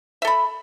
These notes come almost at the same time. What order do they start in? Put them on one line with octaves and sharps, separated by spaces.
E5 A4 B5